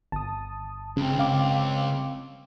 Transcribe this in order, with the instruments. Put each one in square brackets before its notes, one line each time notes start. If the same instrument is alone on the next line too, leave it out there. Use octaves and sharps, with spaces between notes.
[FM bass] G1 [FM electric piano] A5 D#6
[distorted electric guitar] C#2 [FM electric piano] C#3 [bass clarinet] C4
[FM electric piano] C#3 F5 D6